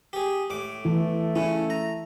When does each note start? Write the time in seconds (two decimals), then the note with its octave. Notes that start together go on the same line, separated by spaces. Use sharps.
0.13 G4 G#4
0.50 A2 D6
0.85 E3 A3 E4
1.36 C#3 C#4 E4
1.70 A#5